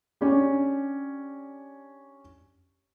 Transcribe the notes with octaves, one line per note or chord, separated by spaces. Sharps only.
C#4 D4 G4